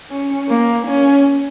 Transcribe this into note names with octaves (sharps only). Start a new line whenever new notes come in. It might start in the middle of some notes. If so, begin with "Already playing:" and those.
C#4
A#3
C#4